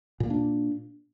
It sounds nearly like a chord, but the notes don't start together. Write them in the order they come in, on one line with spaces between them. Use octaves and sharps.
A#2 A#3 D4